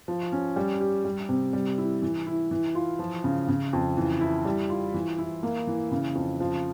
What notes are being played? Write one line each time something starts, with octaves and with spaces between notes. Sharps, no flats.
F3
C#4
G3
G4
G3
C3
G3
E4
E3
E4
E3
F4
F3
C#3
C#3
F2
E3
E4
G3
F4
E3
E4
A#3
E3
C#3
F2
F3